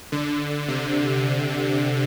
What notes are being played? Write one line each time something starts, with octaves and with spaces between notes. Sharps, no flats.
D3
C3